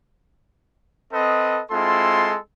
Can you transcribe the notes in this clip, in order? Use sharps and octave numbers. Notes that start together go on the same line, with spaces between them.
C4 A4 B4 D#5
G#3 C4 E4 F4 A4 C6